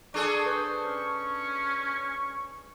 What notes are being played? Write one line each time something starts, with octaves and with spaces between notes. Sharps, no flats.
D4 G#4 A4 C#6
B4 C5 C#6
C#4